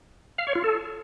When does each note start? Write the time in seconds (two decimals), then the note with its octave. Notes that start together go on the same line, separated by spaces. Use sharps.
0.38 F5
0.47 C#5
0.55 F4
0.64 A4